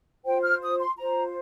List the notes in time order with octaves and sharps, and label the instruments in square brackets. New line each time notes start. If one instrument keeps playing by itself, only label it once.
[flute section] F4 C5 G5
F6
D#6
C6
F4 C5 A#5